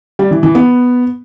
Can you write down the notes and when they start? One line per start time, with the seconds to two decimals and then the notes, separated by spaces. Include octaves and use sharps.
0.19 G3
0.31 E3
0.43 E3
0.55 B3